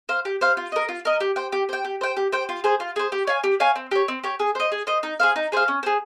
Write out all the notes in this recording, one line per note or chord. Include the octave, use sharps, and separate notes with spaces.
C5 F5
G4
C5 F5
F4
A#4 D#5
F4
A#4 D#5
G4
C5 G5
G4
C5 G5
G4
C5 G5
G4
C5 G5
F4
G#4 C5
F4
G#4 C5
G4
C#5 F5 G#5
G4
C#5 F5 G#5
C4
G4 C#5
C4
G4 C#5
G#4
C5 D#5
G#4
C5 D#5
D#4
G#4 C5 F5
D#4
G#4 C5 F5
C#4
G#4 C5